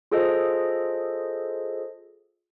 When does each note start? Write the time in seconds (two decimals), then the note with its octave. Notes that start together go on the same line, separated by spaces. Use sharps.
0.12 F4 G#4 A4 C5 D#5